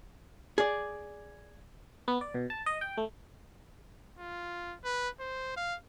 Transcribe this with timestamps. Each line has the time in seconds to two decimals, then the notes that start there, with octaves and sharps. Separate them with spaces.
0.58 G#4 D5
2.08 B3
2.21 D5
2.34 B2
2.50 A5
2.66 D#5
2.81 G5
2.97 A3
4.19 F4
4.84 B4
5.20 C5
5.57 F5